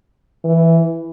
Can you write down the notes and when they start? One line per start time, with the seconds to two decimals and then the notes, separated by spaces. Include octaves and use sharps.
0.44 E3